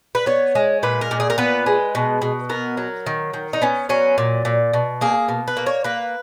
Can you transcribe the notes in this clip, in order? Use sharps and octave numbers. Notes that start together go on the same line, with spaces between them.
B4
B3 C#5
G#3
A#2 B4
A#4
A#2
G#4
A#4
B3 B4
G#3
B2
B2
B3 A#4
F#3
D#3
D#3
D#4
B3 C#4
F#3 C#4
A#2
A#2
B2
A#3 G#4
B2
B4
A#3
C#5
A#3 B4